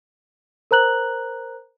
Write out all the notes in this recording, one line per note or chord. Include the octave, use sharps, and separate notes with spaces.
A#4 C5 A#5 F#6 F#7